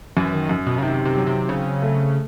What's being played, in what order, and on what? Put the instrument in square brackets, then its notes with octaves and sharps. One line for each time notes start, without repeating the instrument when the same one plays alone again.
[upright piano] F#2 [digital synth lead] E3
[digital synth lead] D#3
[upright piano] F#2
[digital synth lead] B2
C#3
[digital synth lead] C3 [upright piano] D#3
[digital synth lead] C3
[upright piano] F#3
[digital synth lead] C3
[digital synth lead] C#3 [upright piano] C4
[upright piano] A3